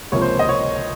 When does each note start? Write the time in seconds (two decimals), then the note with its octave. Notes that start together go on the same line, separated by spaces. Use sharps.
0.12 C#2 C3 F3 A#3 C#5
0.22 C5
0.39 D#5
0.49 C#5